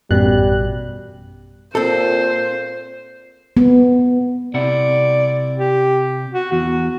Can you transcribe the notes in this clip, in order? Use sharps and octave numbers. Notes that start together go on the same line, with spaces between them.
A1 F#2 B2 G3 F#6
A#2 C4 A4 C5
B3
C3 E4 D5 F#5
G4
F#4
E2 F#4